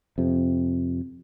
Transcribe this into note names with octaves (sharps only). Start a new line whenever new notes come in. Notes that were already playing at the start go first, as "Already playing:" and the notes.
F2 C3